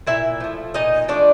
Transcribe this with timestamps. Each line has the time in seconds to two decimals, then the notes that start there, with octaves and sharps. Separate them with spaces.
0.07 A#2 E4 E5
0.40 F3 A3
0.74 A#2 D#4 D#5
1.08 F3 A3 D4 D5